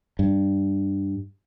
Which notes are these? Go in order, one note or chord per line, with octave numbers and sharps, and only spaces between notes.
G2